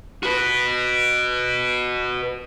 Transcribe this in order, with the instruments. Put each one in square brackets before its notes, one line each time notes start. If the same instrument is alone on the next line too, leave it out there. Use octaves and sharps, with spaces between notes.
[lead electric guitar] F#4 B4